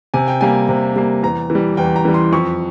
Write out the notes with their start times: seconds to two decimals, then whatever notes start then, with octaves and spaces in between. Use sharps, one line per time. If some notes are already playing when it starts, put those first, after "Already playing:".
0.14 C3 G#5
0.28 G5
0.41 G3 A#3 G#5
0.69 C3
0.96 G3 A#3
1.23 E2 A#5
1.50 E3
1.55 G3
1.77 E2 G5
1.96 A#5
2.05 E3 G3
2.14 C6
2.33 F2 C#6